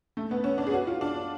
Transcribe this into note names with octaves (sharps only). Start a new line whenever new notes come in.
A3
B3
C#4
D4
G#4
F#4
F4
D4